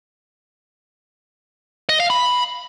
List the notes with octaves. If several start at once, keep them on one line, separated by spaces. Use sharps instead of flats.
D#5
F5
B5